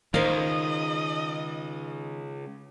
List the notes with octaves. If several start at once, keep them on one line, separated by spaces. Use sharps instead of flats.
C#2 D#3 A#4 C5 D#5 F5